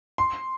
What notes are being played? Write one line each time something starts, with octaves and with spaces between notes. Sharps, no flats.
C6